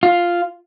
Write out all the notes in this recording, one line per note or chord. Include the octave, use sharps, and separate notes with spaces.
F4